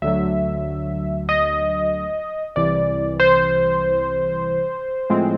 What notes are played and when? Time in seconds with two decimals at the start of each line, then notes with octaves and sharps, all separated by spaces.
0.02 D2 D3 F#3 E5
1.29 D#5
2.56 C2 C3 E3 D5
3.20 C5
5.10 A2 F3 G#3 C4